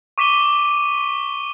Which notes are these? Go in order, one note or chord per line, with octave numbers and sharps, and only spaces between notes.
C#6 D6 B6 D#7 G7